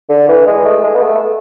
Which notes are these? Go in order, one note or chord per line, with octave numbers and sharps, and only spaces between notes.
D3
E3
G#3
A3
G#3
B3
A3